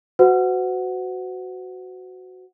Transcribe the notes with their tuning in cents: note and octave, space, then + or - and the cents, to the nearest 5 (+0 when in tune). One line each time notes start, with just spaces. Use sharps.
F#4 +0 C5 -45 F#5 +0